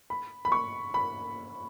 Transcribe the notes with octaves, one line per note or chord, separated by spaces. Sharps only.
B5
B5
C#6
B5